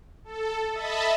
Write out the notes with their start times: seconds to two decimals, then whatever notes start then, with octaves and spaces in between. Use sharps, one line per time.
0.24 A4
0.73 D#5 E5 A5 B5